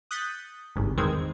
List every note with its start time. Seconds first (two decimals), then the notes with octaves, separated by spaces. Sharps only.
0.11 D#6 F#6 G6 A6 B6 C#7
0.76 G1 C2 G#2
0.97 E2 D#3 G#3 C4 G#6